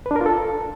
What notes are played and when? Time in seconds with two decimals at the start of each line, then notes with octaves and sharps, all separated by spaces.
0.06 B4
0.11 D4
0.16 A#4
0.21 F4
0.26 A4